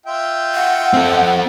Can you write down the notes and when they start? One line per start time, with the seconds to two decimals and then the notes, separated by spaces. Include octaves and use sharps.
0.06 F4 E5 G5
0.55 F#5
0.94 C4 A4